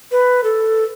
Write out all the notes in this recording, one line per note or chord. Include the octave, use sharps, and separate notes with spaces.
B4
A4